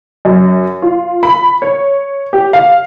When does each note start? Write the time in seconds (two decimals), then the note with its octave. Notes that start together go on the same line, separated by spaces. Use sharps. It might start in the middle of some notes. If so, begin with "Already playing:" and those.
0.25 F#2
0.82 F4
1.23 B5
1.62 C#5
2.33 G4
2.53 F5